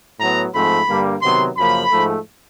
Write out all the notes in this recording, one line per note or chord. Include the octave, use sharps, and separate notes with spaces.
A2 F#3 B3 A#5
G#2 F3 A3 C4 B5
G2 D3 G3 A#3
C3 D#3 F#3 B3 C6
F#2 C#3 F3 A#3 B5
G#2 F3 A3